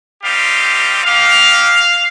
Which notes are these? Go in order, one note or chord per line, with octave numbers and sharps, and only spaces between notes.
G3 C4 D#4 G4 F5
A#3 D#4 G4 F5